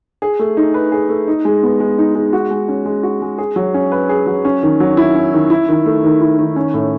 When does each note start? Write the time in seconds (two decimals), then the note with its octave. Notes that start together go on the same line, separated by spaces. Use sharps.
0.22 G#4
0.39 A3
0.57 D#4
0.74 B4
0.92 G#4
1.09 A3
1.28 D#4
1.45 G#3
1.63 B3
1.80 G#3
1.98 D#4
2.15 G#3
2.33 F#4
2.51 G#3
2.68 C#4
2.85 G#3
3.03 F#4
3.22 G#3
3.38 G#4
3.56 F#3
3.74 C#4
3.92 B4
4.09 G#4
4.26 F#3
4.45 C#4
4.63 D#3
4.80 F#3
4.97 E4
5.15 C#4
5.33 D#3
5.50 E4
5.69 D#3
5.86 A3
6.04 D#3
6.21 E4
6.39 D#3
6.56 C#4
6.74 A2